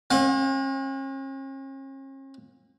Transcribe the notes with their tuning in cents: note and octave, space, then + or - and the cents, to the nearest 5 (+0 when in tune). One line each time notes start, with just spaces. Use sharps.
C#4 -45 F#5 -45